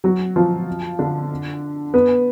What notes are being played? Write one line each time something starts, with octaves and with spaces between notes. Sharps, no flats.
F#3 F#4
F3 F4
D3 D4
B3